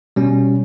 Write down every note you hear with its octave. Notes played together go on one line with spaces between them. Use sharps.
B2 G3 C#4